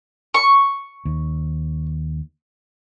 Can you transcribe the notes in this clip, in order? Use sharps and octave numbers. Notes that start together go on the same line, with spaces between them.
C#6
D#2